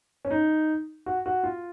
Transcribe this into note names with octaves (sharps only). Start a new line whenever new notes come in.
C#4
D#4
F#4
F#4
F4